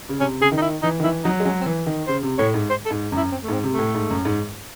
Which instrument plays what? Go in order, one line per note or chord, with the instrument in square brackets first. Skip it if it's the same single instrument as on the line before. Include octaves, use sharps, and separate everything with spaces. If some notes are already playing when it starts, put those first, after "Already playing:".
[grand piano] C#3
[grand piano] C3 [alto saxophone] C#4
[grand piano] C#3 [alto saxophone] G#4
[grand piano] D#3
[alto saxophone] D#4
E4
[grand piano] E3 [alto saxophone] D#4
[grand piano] D#3
[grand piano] E3 [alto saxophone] E4
[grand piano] F#3 [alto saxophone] D#4
[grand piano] G#3
[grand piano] F#3 [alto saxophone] C#4
[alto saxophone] C4
[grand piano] E3
D#3
[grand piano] C#3 [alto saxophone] C5
[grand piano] C3
[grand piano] A2 [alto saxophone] C#5
[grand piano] G#2
[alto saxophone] C5
A4
[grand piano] G#2
F#2
[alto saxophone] E4
C4
A3
[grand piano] G#2 [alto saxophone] C4
[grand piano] C3
[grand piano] A2 [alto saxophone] A3
[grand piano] G#2
F#2
G#2